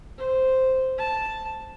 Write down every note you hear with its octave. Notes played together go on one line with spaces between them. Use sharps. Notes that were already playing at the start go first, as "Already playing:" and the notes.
C5
A5